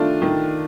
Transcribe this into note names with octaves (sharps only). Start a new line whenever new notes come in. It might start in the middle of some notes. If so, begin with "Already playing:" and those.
Already playing: D#3 A3 D4 F4
D#3